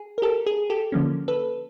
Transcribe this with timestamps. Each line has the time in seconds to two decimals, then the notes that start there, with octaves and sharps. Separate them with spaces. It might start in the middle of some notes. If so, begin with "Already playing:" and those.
Already playing: G#4
0.18 A#4
0.22 G4 A4
0.46 G#4
0.70 G4 A4
0.92 D3 F3 A#3 C#4
1.28 A4 B4